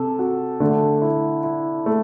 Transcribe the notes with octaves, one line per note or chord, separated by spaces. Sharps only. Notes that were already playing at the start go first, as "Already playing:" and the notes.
Already playing: C3 A4
F#4
D3 A3
E4
E4
A3